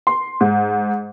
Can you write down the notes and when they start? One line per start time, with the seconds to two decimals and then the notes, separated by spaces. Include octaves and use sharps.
0.07 C6
0.41 G#2